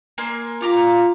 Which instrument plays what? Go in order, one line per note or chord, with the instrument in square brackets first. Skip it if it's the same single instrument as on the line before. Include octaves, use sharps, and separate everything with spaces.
[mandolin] A#3 G#5 C6
[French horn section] F4 [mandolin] G4 A#5 D6